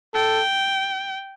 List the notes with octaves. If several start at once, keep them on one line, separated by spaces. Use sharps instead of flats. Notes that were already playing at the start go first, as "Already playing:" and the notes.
A4 G5